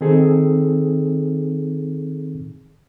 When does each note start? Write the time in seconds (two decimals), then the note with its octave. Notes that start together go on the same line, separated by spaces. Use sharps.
0.01 D#3 C4 D#4 G#4 A4